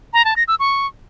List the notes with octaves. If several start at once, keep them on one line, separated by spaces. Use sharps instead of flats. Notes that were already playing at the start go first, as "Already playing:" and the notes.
A#5
A5
A#6
E6
C#6